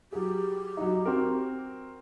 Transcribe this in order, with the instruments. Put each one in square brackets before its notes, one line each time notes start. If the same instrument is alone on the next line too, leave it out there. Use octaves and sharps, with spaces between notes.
[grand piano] F#3 G#4 [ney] G4
[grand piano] F#3 D#4
C4 F#4 A#4